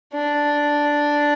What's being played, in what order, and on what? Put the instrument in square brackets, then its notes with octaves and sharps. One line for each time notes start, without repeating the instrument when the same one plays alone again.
[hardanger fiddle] D4